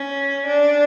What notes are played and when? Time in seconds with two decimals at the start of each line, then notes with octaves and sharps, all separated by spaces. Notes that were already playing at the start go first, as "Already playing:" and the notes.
Already playing: C#4
0.47 D4